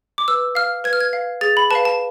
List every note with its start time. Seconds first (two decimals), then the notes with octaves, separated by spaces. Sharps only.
0.18 D6
0.28 B4 E6
0.55 F5 F6
0.84 B4 G#6
0.93 F6
1.01 G#6
1.13 F5
1.41 G#4 A6
1.57 B5
1.71 B4 F5 A5
1.85 A5